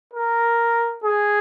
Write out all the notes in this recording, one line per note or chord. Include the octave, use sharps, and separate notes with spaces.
A#4
G#4